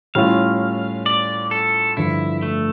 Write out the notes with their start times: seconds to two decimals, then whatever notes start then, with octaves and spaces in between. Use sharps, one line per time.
0.15 A2 G3 C#4 F4 F5
1.06 D5
1.51 A4
1.97 G2 D3 F3 E4
2.43 A3